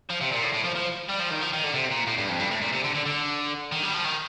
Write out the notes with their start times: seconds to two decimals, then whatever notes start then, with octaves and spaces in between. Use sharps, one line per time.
0.09 F3
0.21 C3
0.31 A#2
0.42 A2
0.53 A2
0.64 F3
0.75 F3
1.09 G3
1.19 F3
1.30 D#3
1.41 F3
1.52 D#3
1.64 D3
1.74 C3
1.91 A#2
2.07 A2
2.18 G2
2.29 F2
2.40 G2
2.51 A2
2.62 A#2
2.73 C3
2.84 D3
2.95 D3
3.06 D3
3.72 D#3
3.83 G3
3.94 F3
4.05 D#3